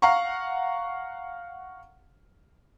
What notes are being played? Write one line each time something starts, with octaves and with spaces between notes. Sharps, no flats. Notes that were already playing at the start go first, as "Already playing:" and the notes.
F5 F#5 A#5 C#6